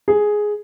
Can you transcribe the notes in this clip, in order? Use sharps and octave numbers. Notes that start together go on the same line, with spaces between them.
G#4